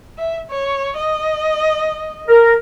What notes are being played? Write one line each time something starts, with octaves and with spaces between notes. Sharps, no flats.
E5
C#5
D#5
A#4